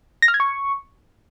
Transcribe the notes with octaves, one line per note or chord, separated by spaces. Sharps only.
A#6
F6
G#6
C#6